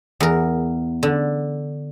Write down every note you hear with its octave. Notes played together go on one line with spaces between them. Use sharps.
E2 A#4
D3